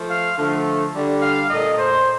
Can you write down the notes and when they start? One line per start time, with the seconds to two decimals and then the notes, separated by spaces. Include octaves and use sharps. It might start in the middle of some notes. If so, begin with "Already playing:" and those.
Already playing: F3 A3
0.09 F5
0.37 D3 F3 A3
0.93 D3 G3
1.22 F5
1.49 A#2 A3 D#5
1.78 C5